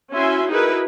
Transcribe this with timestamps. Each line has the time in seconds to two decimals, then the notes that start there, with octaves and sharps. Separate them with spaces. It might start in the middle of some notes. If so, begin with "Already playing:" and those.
0.11 C#4 E4 F#4 E5 G#5 C6
0.48 D#4 E4 F#4 G#4 A#4 B4